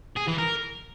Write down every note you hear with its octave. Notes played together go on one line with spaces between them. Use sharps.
G#4
E3
A#4